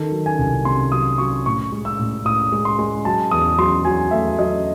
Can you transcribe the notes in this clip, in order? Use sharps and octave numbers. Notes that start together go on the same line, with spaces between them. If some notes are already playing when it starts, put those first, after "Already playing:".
Already playing: D#3 A4
F#3
G#5
C2
C3 C6
F#3 D#6
F#3 C#6
A2 C#6
G#3
E6
A2
A2 D#6
G#3
C6
G#3
F#3 A5
E2 D#6
F#3 C6
F#3 G#5
A3 E5
F#3 D#5